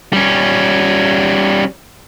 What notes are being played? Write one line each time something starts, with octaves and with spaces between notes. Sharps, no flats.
G3 C#4